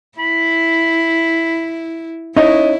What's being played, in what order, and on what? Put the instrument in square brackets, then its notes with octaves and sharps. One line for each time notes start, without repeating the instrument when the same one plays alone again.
[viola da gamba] E4 [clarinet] B5
[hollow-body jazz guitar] C#4 D#4 C#5 [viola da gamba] E4 [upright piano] D#5